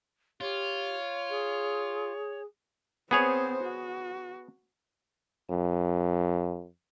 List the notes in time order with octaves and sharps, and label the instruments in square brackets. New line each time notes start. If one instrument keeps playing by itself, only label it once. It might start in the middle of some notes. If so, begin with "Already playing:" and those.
[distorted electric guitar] F4 [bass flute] G4 [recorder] C#5
[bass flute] G#4
[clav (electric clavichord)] B3 G#4 C#5 [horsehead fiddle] C4 C5
[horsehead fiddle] F#4
[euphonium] F2